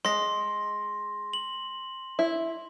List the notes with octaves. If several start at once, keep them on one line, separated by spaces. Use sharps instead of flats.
G#3 C6 A#6
F#7
E4